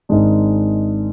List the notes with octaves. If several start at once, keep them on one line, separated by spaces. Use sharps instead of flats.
G#1 G#2 G#3 D4